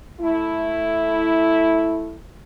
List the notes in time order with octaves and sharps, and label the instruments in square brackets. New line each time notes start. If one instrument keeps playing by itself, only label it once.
[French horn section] A3 E4